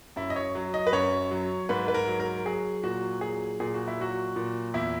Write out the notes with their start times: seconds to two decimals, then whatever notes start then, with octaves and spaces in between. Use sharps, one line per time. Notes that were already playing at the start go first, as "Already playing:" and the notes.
0.16 F#2 E4
0.30 D#5
0.36 C#5
0.55 F#3
0.74 D#5
0.87 B4
0.93 F#2 C#5
1.31 F#3
1.69 G#2 B4
1.88 B4
1.94 A#4
2.08 F#3
2.20 A#4
2.45 F#3 G#4
2.84 A#2 F#4
3.21 F#3 G#4
3.60 A#2 G#4
3.74 F#4
3.87 E4
3.98 F#3 F#4
4.36 A#2
4.74 E2 E4